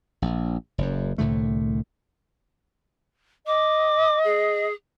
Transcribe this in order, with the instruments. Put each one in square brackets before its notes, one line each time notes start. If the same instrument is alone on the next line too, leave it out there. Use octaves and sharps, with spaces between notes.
[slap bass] A#1
F#1 F#2
C2 A2 D3 A3
[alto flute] D#5 [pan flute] D6
[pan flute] G#4